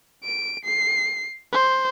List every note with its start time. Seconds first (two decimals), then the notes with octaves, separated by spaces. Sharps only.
0.24 D7
0.65 C7
1.53 C5